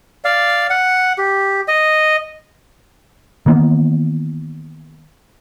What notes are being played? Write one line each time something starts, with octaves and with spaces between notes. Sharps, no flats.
D5 F5
F#5
G4
D#5
D#3 E3 A#3 B3